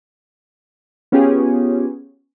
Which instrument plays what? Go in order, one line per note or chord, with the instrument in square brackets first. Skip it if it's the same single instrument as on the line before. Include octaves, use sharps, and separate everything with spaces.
[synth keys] B3 C#4 F4 G4 G#4